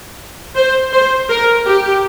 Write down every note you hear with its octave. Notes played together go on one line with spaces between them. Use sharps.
C5
C5
A#4
G4